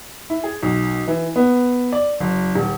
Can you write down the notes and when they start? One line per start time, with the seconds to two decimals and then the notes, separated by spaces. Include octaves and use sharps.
0.30 E4
0.44 G#4
0.63 B1
1.08 E3
1.36 B3
1.92 D5
2.20 F#1
2.55 D#1